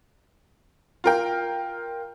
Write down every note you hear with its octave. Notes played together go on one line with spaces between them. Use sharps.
F4 A#4 G5